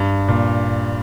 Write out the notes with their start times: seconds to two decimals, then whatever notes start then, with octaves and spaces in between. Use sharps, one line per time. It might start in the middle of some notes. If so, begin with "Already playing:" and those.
Already playing: G2
0.28 A#2